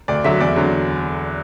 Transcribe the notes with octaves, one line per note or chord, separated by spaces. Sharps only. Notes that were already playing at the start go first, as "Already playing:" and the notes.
D2 D5
D3 F#3 E5
E2 D5
D3 F#3